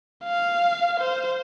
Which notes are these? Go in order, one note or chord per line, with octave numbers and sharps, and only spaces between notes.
F5
C5